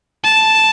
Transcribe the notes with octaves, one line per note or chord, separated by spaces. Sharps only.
A5